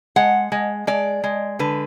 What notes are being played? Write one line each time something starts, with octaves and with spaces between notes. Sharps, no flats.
G#3 F#5
G#3
G#3 D5
G#3
D3 B4